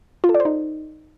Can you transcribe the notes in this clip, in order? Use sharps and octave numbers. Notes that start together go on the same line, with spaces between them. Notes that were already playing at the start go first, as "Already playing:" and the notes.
F4
A4
D5
C5
D#4